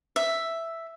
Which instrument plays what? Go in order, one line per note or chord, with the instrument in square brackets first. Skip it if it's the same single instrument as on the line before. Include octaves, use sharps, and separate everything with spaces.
[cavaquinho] E5